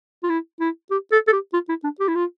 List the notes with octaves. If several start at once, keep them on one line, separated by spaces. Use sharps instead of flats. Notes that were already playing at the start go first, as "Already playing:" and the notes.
F4
E4
E4
G4
A4
A4
G4
F4
E4
D4
G4
E4
F4